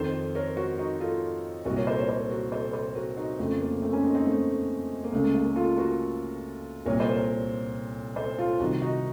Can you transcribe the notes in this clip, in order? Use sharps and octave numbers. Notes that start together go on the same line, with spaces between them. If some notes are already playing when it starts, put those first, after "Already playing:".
Already playing: F2 D#3 A4 C5
A#4 C#5
F#4 A#4
D#4 F#4
F4 A4
C2 A#2 F#4 A#4
A#4 C#5
A4 C5
A#4 C#5
A4 C5
F#4 A#4
A4 C5
A4 C5
F#4 A#4
D#4 F#4
F2 C#3 A3
A#3
A3 C4
A#3 C#4
C4 D#4
C4 D#4
A3 C4
A#3
C#2 C#3 A3
A#3
A3
A#3
F4 A4
F#4 A#4
C2 A#2 A#4 C#5
A4 C5
A#4 C#5
A4 C5
F4 A4
C2 C3 D#3 D#4 F#4
D#4 F#4